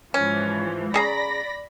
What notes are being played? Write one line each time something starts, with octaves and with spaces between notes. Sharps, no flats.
G#2 E3 F3 C#4
C#3 G#4 D5 A#5 B5 A#6